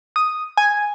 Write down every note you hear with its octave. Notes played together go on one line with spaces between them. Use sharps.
D#6
G#5